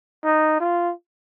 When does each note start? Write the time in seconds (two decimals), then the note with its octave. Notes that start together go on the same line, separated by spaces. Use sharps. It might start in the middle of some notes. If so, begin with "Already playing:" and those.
0.24 D#4
0.60 F4